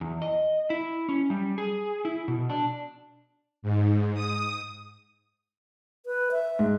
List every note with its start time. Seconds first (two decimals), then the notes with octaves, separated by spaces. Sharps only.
0.01 E2
0.22 D#5
0.70 E4
1.09 C#4
1.30 G3
1.58 G#4
2.05 E4
2.28 B2
2.50 D4
3.62 G#2
4.14 D#6
6.06 B4
6.32 E5
6.59 G#2